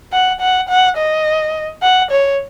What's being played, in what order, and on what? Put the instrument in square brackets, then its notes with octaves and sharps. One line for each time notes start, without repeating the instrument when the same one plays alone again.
[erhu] F#5
F#5
F#5
D#5
F#5
C#5